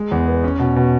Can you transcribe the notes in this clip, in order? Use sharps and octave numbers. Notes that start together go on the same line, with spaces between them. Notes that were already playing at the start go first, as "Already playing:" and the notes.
Already playing: G#3
E2
B3
C#4
B2
B2